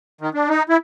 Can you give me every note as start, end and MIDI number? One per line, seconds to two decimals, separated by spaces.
0.21 0.30 51
0.34 0.49 62
0.49 0.63 63
0.69 0.77 64